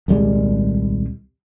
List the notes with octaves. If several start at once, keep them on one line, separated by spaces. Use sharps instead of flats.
D#1 C2 G3 G#3